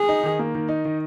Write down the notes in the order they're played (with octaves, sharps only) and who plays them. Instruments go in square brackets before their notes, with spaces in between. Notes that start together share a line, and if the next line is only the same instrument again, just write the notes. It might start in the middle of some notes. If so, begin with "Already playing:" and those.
Already playing: [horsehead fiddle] G#4
[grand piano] D#4
D#3
A#3
D#3
D#4
D#3